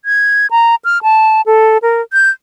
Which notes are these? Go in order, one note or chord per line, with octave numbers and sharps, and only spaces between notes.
G#6
A#5
F6
A5
A4
A#4
G6